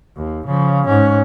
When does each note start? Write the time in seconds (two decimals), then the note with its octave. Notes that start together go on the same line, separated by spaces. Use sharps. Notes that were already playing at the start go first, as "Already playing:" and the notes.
0.16 D#2
0.46 C#3 F3
0.85 G#2 C#4